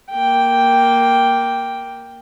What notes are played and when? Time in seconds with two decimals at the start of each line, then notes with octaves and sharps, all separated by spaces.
0.11 A#3 G5